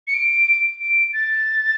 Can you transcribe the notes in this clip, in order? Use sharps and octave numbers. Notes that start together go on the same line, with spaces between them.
C#7
D7
D7
A6